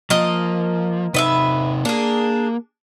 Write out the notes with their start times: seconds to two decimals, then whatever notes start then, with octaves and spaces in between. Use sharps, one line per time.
0.10 F3 A#3 D#5
1.14 C3 D#4 B4 D#5 E5
1.85 A#3 D4 G#4